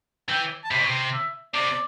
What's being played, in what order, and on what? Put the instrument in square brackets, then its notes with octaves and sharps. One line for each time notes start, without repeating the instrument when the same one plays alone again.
[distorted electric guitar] E3 [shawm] G5
[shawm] A5
[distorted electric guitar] C3 [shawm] B5
[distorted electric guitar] B2
C3
[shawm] E5
[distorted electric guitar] C3 [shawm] D5